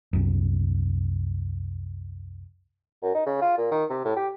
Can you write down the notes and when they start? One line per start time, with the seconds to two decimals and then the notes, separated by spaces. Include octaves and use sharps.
0.13 C2 F#2
3.02 F#2
3.15 D#4
3.26 C#3
3.42 F4
3.58 A#2
3.71 D#3
3.90 C3
4.05 A2
4.16 G4